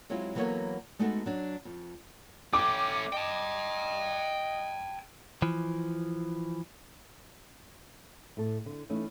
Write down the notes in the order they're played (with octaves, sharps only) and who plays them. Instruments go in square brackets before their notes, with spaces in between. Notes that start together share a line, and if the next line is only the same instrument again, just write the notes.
[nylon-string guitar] F#3 G#3 C4 E4 F4
E3 F#3 A#3 B3 A4 C#5
G#3 A3 B3 D#4 F#4 A4
F#3 D4
F2
[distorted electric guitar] A3 C#4 [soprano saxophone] G5 [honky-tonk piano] D6
[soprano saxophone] D#5 [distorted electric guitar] G5 A5
[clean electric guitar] E3 F3
[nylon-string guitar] A2 A4
D3
E3 A3 C#4 D#4